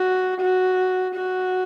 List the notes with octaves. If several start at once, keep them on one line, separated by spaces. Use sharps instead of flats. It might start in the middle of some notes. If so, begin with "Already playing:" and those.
Already playing: F#4
F#4
F#4